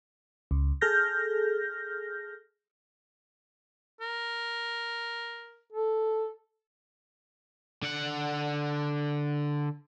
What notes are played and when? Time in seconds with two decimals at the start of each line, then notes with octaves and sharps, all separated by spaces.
0.51 C#2
0.81 G#4 A4 F6 G6 A#6
4.01 A#4
5.72 A4
7.82 D3 F#5